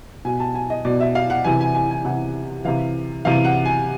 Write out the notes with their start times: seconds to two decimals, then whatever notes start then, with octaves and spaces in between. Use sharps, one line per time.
0.25 B2 G#5
0.40 A5
0.55 G#5
0.70 D#5
0.85 B2 D5
1.00 E5
1.15 F5
1.30 F#5
1.44 C3 E3 G#5
1.61 G#5
1.75 G#5
1.91 G#5
2.05 C3 E3 F#5
2.65 C3 E3 F5
3.25 C3 E3 F5
3.45 F#5
3.66 G#5